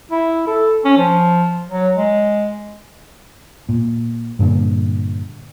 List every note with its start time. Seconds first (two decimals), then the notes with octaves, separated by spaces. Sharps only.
0.11 E4
0.47 A4
0.84 C#4
0.98 F3
1.69 F#3
1.96 G#3
3.69 A#2
4.39 G2 A#2 D3